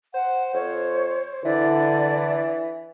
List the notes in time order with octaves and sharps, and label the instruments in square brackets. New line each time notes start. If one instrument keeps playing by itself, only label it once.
[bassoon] C5 [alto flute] F#5
[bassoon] F2 [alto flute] C5 [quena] C#5
[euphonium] D3 [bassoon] E3 [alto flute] E4 [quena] D5